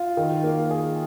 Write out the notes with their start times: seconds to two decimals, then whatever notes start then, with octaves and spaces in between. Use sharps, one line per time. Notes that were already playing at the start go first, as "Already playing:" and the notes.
Already playing: F4
0.17 D#3
0.44 A#3
0.70 G#4